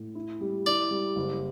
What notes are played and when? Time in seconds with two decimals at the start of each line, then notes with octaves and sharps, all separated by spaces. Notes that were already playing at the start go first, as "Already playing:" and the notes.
Already playing: A2
0.15 E4
0.41 G3
0.66 E4 D5
0.91 G3
1.16 F#1